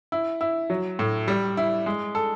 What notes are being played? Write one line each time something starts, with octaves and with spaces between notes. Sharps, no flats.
E4
E4
F#3
A2
G3
E4
G#3
A4